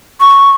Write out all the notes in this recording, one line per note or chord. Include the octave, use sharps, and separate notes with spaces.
C#6